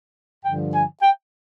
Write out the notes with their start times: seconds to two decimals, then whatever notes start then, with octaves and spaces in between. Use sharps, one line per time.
0.45 G2 D3 F3 G5
0.73 G#5
1.01 G5